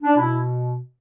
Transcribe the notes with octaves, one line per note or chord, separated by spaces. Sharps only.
D4
B2 E4